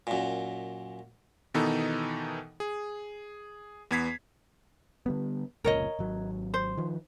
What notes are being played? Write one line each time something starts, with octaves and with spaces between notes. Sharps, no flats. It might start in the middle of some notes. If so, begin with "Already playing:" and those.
F#2 A#2
B2 D#3 E3 B3 D#4 A4
G#4
E2 B3 G#6 B6 C7
D3 G3 B3
F1 C#2 A#2 A#4 C#5 D#5
G#1 F#3
C5
D#3 F3